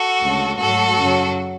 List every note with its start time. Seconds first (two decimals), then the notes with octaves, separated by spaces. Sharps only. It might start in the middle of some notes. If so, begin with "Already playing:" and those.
Already playing: F#4 A4
0.22 D2 C#3 G#3
0.59 G#2 F#3 A3 F#4 A4
0.98 F#2 C#3 F#3